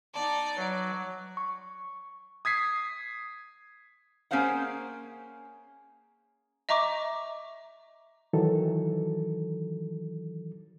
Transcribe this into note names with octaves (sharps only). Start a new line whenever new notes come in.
B3 D#4 D5 A5 A#5
F#3 B4 D#5
C#6
D#6 G#6 B6 C7
A#3 C#4 G#4 C5 F5 F#5
D#5 E5 A#5 C#6 D6
D#3 E3 F#3 A4